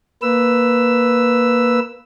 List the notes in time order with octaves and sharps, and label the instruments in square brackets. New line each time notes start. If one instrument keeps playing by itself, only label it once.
[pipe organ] A#3 B4 E6